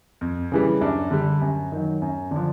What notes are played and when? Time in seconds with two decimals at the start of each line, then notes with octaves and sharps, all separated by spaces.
0.21 F2
0.52 C#3 E3 G3
0.81 F#2 D4
1.11 D3 G3
1.41 F#2
1.72 D#3 F#3
2.02 F#2
2.31 D3 D4
2.36 F3